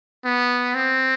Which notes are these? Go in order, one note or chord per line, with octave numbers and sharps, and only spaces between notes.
B3
C4